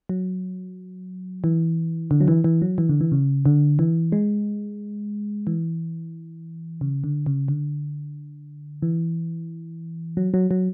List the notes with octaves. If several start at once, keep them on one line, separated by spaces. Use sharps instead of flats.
F#3
E3
D3
F#3
E3
E3
F#3
E3
D3
E3
C#3
D3
E3
G#3
E3
C#3
D3
C#3
D3
E3
F#3
F#3
F#3